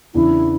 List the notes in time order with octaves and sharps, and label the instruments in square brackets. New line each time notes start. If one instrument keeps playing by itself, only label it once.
[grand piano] E2 C#3 E3 B3 D4 [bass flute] E4